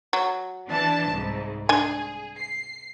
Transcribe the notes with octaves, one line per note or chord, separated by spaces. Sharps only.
F#3
E3 D4 A5
C2 G#2
D4 G#4 G#5
C7